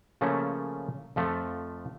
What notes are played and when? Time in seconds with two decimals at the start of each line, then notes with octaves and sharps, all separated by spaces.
0.21 C#3 F3 A3 A#3 C#4
1.16 F2 F3 A3